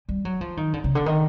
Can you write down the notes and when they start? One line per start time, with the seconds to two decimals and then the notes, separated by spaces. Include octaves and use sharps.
0.09 G3
0.25 F#3
0.41 F3
0.57 D#3
0.73 D3
0.84 C#3
0.95 D3
1.06 D#3